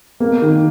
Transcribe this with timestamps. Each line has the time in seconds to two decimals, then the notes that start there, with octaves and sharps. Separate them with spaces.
0.20 A#3
0.42 D#3